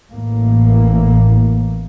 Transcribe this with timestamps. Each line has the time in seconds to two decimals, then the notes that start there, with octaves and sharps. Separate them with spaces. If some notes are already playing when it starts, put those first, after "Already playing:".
0.11 A1 A2 E3 A#3